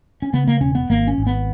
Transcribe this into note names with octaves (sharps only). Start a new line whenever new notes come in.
C#4
C#3 B3
A#3
E1 C#4
B3
G#1 A#3
C#4
G#1
B3